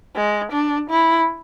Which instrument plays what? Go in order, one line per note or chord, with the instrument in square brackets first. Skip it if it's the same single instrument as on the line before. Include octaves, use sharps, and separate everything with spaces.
[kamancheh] G#3
D4
E4